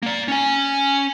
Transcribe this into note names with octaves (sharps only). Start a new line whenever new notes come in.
A#3 D5
C#4 G#5